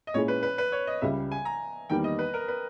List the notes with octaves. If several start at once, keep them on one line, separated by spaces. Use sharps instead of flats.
D#5
A#2 G#3 C#4 E4 G#4 C#5
B4
B4
B4
C#5
D#5
C#2 C#3 G3 E5
G#5
A#5
E2 D#3 G3 A#3 G5
D#5
B4
A#4
B4